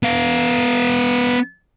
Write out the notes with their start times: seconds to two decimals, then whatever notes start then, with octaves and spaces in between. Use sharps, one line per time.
0.03 B3 F5